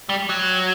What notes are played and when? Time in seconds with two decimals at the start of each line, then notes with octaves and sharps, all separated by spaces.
0.09 G3
0.29 F#3